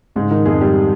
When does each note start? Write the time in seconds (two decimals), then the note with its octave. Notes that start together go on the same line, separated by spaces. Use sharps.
0.16 G#2 C#3 G#3
0.31 D#3 D#4
0.46 F2 G#3 G#4
0.61 G3 G4